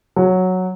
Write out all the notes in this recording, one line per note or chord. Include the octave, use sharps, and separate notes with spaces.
F#3